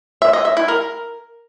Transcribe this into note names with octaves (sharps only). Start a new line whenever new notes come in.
E5
D#5
E5
E4
A#4